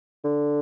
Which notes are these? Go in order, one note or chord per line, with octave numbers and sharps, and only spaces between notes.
D3